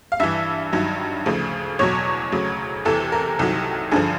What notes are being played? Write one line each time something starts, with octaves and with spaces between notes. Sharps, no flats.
F5
G2 E3 E5
G2 D#3 F#3
D2 C#3 F3
E2 B2 F#3 C#5
D2 C#3 F#3
E2 C3 E3 A4
A#4
C2 C3 D#3 F#3 A4
G2 D3 F3 G#4